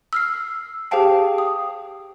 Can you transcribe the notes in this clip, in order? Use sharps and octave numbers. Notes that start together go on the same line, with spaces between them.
E6 F6 C7
G4 G#4 C5 F5 G5 A5
D#6